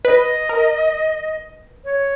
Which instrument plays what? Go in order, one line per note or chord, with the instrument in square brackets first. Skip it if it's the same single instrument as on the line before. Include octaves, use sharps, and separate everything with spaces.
[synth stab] B4 [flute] D#5
[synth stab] A#4
[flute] C#5